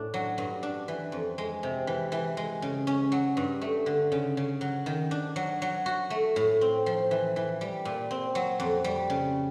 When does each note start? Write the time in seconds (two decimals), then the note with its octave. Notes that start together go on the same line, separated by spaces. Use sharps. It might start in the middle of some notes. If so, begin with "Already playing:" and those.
Already playing: A2 D4
0.14 F#3
0.38 G2
0.63 D4
0.88 E3
1.12 F2
1.38 G#3
1.63 C3
1.87 E3
2.12 E3
2.37 G#3
2.62 C#3
2.87 C#4
3.12 F#3
3.37 G2
3.61 A3
3.86 D3
4.12 C#3
4.37 C#3
4.61 F#3
4.86 D#3
5.11 D4
5.36 F#3
5.62 F#3
5.86 F#4
6.10 A3
6.36 A2
6.61 C4
6.86 F3
7.11 E3
7.36 E3
7.61 G3
7.85 A#2
8.11 C4
8.35 F#3
8.60 F2
8.84 G3
9.10 C#3